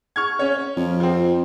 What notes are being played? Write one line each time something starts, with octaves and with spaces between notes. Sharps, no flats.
C#6 F6 G#6
C#4 C#5
F2
F3 C4